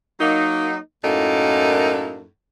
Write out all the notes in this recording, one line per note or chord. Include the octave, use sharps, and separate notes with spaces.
F#3 A#3 D#4
F#2 A2 A#3 D#4 E4 A4